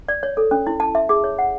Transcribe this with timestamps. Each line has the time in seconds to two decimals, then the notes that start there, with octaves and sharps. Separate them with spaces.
0.08 D5
0.23 C#5
0.37 A4
0.51 C#4
0.67 E4
0.80 A5
0.95 E5
1.09 G#4
1.24 C#5
1.39 F#5